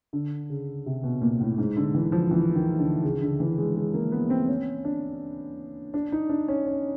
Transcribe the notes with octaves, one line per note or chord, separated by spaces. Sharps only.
D3
C#3
C3
B2
A#2
A2
G#2
D3
E3
F3
E3
D#3
D3
C#3
D3
E3
G#3
G#3
A#3
B3
C4
C#4
D4
D4
D#4
D4
C#4
C#4